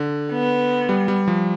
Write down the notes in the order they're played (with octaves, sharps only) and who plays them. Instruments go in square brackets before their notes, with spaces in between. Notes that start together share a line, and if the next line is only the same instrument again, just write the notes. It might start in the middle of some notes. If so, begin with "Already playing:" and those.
Already playing: [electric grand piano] D3
[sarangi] B3
[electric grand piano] G3
G3
F3